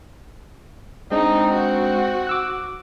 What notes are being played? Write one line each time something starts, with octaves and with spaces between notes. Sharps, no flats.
G#3 C4 D4 D#4
F#4
D6 E6 F#6